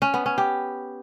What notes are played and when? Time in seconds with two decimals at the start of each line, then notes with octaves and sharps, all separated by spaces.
0.02 C#4
0.14 B3
0.26 C#4
0.38 G4